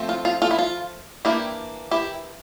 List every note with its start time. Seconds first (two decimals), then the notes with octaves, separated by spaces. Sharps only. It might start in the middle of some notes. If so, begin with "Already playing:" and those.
Already playing: F3 A3 C4
0.09 F4
0.25 F4
0.42 F4 A4
0.51 E4
0.59 F4
1.25 E3 A#3 D4 E4 G4
1.91 E4 G4